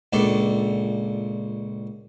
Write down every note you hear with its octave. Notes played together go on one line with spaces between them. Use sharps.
C#2 A#2 D4 A4